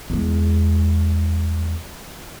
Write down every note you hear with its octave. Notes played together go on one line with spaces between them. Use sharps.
E2 G#3